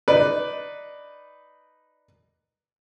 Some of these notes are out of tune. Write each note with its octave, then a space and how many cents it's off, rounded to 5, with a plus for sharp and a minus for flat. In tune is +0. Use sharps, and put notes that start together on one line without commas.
D#4 +0 B4 +5 D5 +0